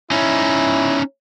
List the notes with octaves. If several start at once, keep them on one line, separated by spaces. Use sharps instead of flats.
C#4 D#4 E4